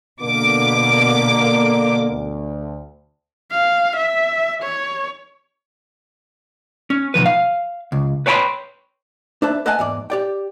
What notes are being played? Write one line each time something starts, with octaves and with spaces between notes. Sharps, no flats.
B2 D3 A#3 D6
D2
F5
E5
C#5
C#4
B1 A#2 F3 B4
F5
C#2
B4 C#5 G5 A5 B5 C6
D4 B4 C5 E5 A5
B4 D#5 E5 F#5 G#5 A5
E2 G#2 D5
G4 D5 G5